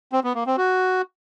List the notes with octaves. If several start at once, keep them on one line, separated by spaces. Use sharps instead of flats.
C4
B3
A#3
C4
F#4